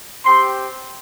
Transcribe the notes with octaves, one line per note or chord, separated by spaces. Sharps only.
C4 G4 C6